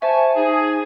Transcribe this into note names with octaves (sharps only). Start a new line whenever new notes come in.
C5 E5 G#5 A5 C#6
D#4 G#4